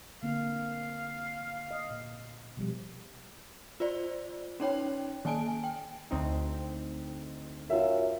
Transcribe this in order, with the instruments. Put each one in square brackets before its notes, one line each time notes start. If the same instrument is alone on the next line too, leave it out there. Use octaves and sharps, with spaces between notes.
[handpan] D3 A#3 C4 [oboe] F5
[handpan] D#5
A#2
B2 F3 G3
[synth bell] F4 C5 D5
C#4 D#4 C#5 G5
D#3 A#3 G#5 A5 D7
G5
[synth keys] D2 C4 D#4
[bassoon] F#2 [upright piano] F4 E5